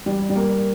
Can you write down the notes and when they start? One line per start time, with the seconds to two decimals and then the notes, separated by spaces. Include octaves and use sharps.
0.06 G3
0.30 G3
0.36 A#3